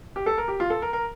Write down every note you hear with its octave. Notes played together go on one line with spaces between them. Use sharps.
G4
A4
A#4
G4
F4
A4
A#4
A#4